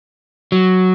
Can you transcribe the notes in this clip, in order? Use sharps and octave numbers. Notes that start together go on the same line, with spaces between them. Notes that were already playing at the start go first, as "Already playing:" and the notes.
F#3